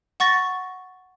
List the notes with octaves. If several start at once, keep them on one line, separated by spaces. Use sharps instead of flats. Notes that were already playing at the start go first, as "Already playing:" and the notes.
F#5 C#6 A6 A#6